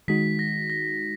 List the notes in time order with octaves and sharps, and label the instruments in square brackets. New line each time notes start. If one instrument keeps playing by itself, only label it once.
[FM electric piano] D#3 G#3 D#4 F#4 [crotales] B6
[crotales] A#6
A#6